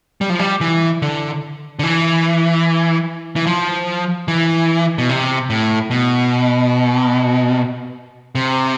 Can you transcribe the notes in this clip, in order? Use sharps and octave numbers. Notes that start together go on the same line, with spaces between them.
G3
F3
G3
E3
D3
D3
E3
E3
F3
E3
B2
C3
A2
B2
C3